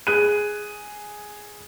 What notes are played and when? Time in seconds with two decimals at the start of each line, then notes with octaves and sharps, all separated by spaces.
0.07 G#4 F#6 D#7